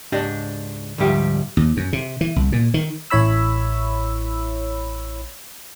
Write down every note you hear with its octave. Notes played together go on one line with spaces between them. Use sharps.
C#2 G#2 D4 G4 D#5
D2 G#2 F3 G3 G4 E5
D#2
F#2
C3
E3
C2
A#2
D#3
A1 E4 C#5 B5 E6